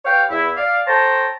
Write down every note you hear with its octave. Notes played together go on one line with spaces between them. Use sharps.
G4 B4 C#5 F5 G5
E2 E4
D5 F5
A4 C5 C#5 G5 A5 A#5